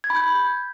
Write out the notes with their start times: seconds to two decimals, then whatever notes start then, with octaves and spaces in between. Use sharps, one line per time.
0.04 G#6
0.10 B5
0.16 G6